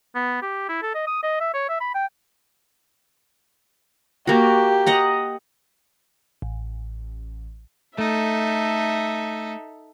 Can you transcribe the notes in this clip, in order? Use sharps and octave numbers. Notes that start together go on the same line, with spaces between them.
B3
G4
E4
A4
D#5
D#6
D#5
E5
C#5
E5
B5
G5
A#3 F#4 G4
D#5 F#5 A#5
A1
A3 D#4 A4 E5